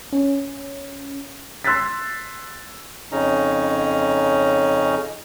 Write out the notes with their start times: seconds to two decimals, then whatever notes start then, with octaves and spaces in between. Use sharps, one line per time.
0.13 C#4
1.64 C6 E6 F#6 G#6 A6 B6
3.12 F2 C#3 C#4 D#4 A#5